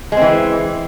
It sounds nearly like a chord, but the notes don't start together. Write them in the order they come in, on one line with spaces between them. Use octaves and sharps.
G#3 C4 E3